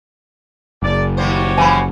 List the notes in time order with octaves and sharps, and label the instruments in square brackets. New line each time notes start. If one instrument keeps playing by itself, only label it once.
[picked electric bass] F#1 [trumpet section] D5
[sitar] D#3 G3 C5 [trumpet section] F#4 G4 C#5
[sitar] E3 F3 E4 [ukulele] G#5 B5